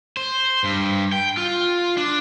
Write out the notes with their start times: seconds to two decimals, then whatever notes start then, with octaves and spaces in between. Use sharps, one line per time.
0.17 C5
0.64 G2
1.12 G5
1.37 F4
1.97 D4